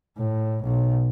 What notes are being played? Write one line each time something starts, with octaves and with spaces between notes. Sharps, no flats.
A2
B1